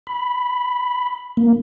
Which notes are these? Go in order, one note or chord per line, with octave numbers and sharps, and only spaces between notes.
B5
A#3